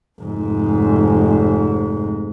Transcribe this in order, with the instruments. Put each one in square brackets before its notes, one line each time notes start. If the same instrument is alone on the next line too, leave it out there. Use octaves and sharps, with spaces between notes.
[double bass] F1 G#2